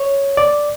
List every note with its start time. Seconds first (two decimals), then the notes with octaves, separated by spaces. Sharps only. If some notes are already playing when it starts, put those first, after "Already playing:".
Already playing: C#5
0.37 D5